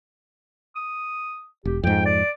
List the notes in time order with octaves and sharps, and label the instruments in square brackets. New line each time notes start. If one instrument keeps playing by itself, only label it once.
[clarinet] D#6
[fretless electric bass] E1 [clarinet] G4
[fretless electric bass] F2 G#2 [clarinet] G5
[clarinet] D5